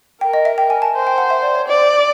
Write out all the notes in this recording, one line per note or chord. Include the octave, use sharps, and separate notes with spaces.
A#4 G5
D#5
E5
G5
G#5
A5
C5
G5
F#5
E5
D5
C#5
C5 D5